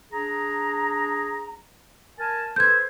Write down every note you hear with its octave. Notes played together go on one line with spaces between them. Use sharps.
D4 G#4 A#5
A#4 G#5 A5
A4 B4 C5 G6 G#6